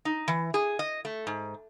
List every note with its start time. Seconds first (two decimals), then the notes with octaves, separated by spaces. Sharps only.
0.05 D#4
0.28 E3
0.54 G#4
0.79 D#5
1.05 A3
1.27 G#2